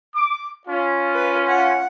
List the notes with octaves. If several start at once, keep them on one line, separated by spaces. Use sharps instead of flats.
D6
C#4 F4
B4
F#5